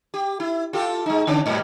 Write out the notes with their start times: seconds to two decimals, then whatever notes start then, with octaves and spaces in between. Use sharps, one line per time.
0.14 G4
0.40 E4
0.73 F4 G4 A4
1.06 G#3 D#4
1.27 D3 C#4 D4
1.46 G#2 B2 G3